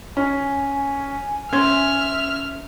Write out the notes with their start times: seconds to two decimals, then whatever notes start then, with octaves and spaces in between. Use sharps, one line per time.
0.17 C#4 G#5
1.53 C#4 C5 E5 F6 G#6